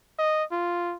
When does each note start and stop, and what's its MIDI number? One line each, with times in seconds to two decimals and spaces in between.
0.19 0.44 75
0.51 0.95 65